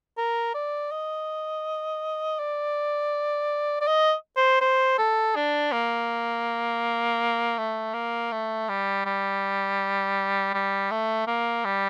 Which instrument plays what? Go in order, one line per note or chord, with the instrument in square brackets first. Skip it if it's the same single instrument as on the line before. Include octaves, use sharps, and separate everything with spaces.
[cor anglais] A#4
D5
D#5
D5
D5
D#5
C5
C5
A4
D4
A#3
A3
A#3
A3
G3
G3
G3
A3
A#3
G3